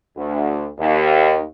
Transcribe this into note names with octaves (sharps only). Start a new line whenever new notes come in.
D2
D#2